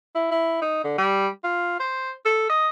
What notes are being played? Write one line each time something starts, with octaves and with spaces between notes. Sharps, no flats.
E4
E4
D#4
D3
G3
F4
C5
A4
D#5